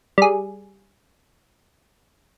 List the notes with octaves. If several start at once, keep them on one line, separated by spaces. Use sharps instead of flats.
G3 G#4